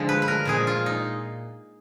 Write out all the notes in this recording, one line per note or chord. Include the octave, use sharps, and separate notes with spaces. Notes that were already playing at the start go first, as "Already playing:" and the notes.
Already playing: D3 F3 G#3
B4
B4
A#4
A#2 F3 G#3 G#4
F4
D#4